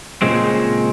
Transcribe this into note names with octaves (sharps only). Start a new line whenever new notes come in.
A#2 C#3 G#3 C4